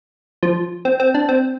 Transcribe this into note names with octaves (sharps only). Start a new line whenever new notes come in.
F3
C4
C4
D4
C4